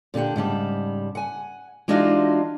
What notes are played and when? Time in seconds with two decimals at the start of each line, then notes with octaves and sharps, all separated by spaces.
0.14 A#2 D3 D4 G4 F#5
0.36 G#2 C#3 G3 A5
1.15 F#5 G#5
1.88 E3 G#3 D4 D#4 F4 F#4